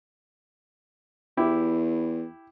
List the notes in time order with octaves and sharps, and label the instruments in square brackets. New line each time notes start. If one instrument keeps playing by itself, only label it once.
[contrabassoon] E2 [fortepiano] E4 G4